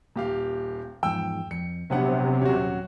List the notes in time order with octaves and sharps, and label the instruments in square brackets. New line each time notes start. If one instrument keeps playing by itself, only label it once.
[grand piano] D#1 G4 F5 [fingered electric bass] A#3
[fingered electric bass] E2 G#2 F3 [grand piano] G5 E6
[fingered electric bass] F2 [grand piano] C#7
[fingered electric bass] A#1 D4 [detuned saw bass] C3 [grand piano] F#3 B3 F#5
[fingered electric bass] D#1 C#4 [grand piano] F#3 F#4